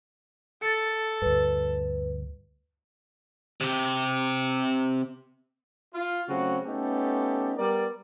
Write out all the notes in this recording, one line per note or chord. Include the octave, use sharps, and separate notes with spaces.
A4 A6 C#7
D2 G2 B4
C3 G4
F4
C#3 F#3 A3 C4 F#4
A3 B3 C#4 D#4 G4 A4
G3 B3 A#4 D5